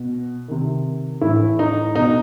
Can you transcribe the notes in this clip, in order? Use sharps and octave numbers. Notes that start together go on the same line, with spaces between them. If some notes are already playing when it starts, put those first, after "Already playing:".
Already playing: B2
C3 D#3
A2 E3 E4
D#4
B2 D#4